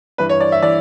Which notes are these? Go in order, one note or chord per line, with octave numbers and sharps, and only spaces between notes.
G2 E3 B4
C#5
D5
E5
E3 D5